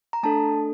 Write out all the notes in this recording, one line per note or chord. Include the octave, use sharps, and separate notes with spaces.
A#5
A3 D4 A4 A5